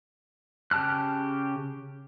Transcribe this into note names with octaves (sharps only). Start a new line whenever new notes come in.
C#3 G4 A5 F6 F#6